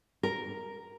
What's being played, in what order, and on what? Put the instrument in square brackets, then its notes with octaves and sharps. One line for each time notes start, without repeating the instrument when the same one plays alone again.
[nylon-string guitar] A#4